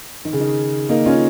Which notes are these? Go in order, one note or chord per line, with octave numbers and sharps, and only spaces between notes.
D#3
C#3
D#3
A#3 D#4
C#4 F4